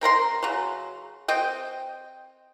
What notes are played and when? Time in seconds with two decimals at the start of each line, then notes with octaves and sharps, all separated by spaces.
0.01 C4 A#4 A#5 C6
0.43 C#3 F#3
1.28 C4 D#5 G5